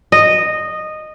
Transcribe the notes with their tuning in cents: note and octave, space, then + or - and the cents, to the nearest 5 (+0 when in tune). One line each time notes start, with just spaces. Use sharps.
D#5 -10